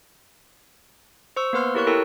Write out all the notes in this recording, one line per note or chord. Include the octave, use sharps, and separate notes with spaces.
C5 C#6 E6
A#3 B3 B4 C6 F6
E4 G4 A#4 C#5 C#6 F#6
E4 G4 A4 A#4 G5 E6